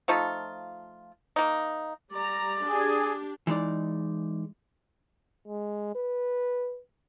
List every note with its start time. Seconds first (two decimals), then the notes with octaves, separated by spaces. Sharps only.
0.08 F3 A3 D#4 F4
1.36 A#3 D#4
2.12 G3 D5 A#5
2.64 D4 G4 G#4
3.47 E3 G#3 D#4 D5
5.48 G#3
5.95 B4